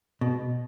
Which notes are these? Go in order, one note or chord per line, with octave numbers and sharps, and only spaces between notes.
B2